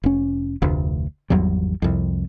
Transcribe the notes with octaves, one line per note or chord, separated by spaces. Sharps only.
F1 C#4
F1 D2
G#1 E2 F#3 G3
C2 F2